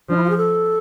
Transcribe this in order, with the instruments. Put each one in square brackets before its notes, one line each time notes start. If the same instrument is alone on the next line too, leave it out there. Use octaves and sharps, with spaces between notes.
[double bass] F3 [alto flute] D4
[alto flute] E4
F4
G#4
A4